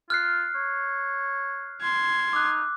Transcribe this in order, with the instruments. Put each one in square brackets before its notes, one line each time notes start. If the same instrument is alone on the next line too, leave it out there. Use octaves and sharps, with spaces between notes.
[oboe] F4 [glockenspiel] F6 F#6 C7
[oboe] C#5
[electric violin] C6 G#6
[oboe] D#4 [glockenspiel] D6 E6 F#6